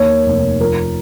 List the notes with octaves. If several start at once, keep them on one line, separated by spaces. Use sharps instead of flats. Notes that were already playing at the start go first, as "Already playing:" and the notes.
Already playing: D#2 C#5
F1
F3 A#4